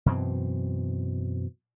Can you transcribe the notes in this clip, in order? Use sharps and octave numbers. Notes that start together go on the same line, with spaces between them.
F#2 B2 E3 C4